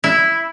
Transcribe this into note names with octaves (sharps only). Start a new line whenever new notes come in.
E4